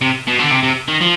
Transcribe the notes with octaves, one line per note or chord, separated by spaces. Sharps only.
C3
B2
D3
C3
C3
D#3
F3